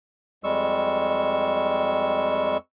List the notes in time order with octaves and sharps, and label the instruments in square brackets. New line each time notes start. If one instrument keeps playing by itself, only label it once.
[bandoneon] F2 G3 G#3 C#6 E6